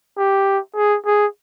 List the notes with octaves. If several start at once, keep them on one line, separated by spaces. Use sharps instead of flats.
G4
G#4
G#4